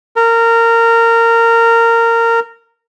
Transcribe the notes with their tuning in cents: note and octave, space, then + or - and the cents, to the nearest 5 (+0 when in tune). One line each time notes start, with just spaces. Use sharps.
A#4 -20